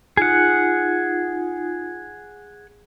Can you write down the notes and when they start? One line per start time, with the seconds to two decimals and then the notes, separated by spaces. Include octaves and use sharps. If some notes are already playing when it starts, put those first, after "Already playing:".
0.17 D#4 F4 G#4 F#5